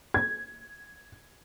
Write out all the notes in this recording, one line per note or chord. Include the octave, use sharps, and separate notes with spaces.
G#6